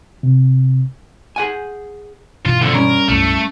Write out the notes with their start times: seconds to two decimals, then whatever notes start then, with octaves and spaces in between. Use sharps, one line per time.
0.23 C3
1.36 G#4 F#5 G#5
2.45 G2 B2 E3 F4
2.62 C2 F2 D3
2.75 G3 C#4 A#4
3.08 B1 F#2 A2 A3